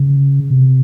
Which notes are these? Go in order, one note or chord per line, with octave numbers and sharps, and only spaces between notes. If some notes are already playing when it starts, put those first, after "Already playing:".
Already playing: C#3
C3